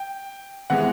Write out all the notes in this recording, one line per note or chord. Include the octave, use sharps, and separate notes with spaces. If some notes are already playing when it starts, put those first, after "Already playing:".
Already playing: G5
C3 E3 G#3 F#5